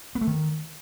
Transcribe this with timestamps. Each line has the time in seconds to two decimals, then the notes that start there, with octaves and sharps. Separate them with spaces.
0.15 B3
0.21 A3
0.27 D#3